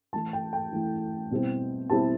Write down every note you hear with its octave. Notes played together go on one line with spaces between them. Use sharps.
E3 A3 E4 A5
G5
G5
E3 A3 E4
B2 G3 C4 E4
B2 G3 C4 E4 A5